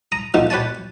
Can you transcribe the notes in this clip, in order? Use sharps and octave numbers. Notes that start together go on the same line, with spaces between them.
A#5 D#6
F3 A3 B3 D#4 E4 G4
G4 B4 C#5 D5 G#5 A5